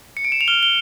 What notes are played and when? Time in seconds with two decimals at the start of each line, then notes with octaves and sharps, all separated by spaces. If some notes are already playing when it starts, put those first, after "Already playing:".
0.17 C#7
0.25 D7
0.32 E7
0.41 F7
0.48 F6 G7
0.63 G7